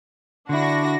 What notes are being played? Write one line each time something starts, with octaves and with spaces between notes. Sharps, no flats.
D3 D4 E4 F#4 A#6